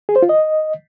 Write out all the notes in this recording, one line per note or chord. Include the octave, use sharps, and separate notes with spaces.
G#4
C5
F4
D#5